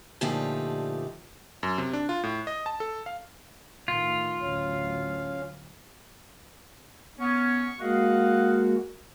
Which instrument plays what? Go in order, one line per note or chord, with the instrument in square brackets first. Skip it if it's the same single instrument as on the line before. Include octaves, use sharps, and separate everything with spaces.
[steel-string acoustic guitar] A#2 D3 F3 A3 D#4 G4
[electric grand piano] F#2
C3
D4
F4
A2
D#5
A5
A4
F5
[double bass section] A2 D#3 A3 [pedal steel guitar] F4
[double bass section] A1 D2 F#3 [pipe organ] C#4 F5
[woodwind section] B3 C#4 [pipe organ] C#6
[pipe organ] G#3 A#3 F#4 [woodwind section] D#5 F5 F#5